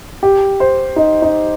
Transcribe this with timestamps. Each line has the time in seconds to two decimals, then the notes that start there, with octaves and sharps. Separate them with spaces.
0.23 G4
0.60 C5
0.96 D#4
1.22 D#4